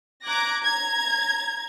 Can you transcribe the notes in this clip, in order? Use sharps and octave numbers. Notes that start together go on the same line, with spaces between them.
A#5 D6 F#6 G#6 A#6
A#5 G#6